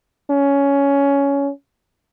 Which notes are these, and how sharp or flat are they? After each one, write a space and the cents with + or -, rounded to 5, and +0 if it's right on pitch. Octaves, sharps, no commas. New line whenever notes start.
C#4 +15